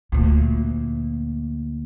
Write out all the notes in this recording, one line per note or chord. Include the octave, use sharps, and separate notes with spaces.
D2 A#2